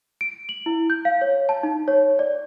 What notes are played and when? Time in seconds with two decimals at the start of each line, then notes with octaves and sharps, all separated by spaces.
0.21 D7
0.49 F#7
0.66 E4
0.90 G6
1.05 F5
1.21 C#5
1.49 A5
1.63 D#4
1.88 C#5
2.19 D5